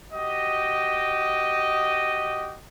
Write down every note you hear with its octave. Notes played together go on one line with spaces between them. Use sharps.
F#4 G4 D#5